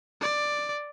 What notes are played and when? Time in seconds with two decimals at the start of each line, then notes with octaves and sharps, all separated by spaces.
0.21 D5